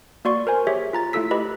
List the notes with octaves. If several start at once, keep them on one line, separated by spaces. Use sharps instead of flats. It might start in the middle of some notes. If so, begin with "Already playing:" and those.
A#3 F#4 D5 C6 C#6
A#4 C5 G#5
G4 G#4 C#5 E5
F4 A#5 A6
A3 E4 F4 A4 E6 B6
G4 B4 D#5 B5